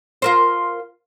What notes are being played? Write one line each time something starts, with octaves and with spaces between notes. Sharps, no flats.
F4 A#4 C5